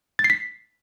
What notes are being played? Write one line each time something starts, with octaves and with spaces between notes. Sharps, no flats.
A6
C7
B6